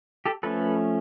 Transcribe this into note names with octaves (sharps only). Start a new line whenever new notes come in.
G4 A4
F3 A3 C#4 A4 B4